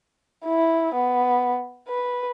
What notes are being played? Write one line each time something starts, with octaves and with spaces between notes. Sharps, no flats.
E4
B3
B4